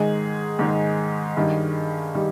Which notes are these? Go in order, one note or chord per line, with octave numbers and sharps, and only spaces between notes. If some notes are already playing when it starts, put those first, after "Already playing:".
Already playing: G#2 D#3 G#3 G#4
G#2 D#3 G#3
G2 D#3 G3
D#3 G3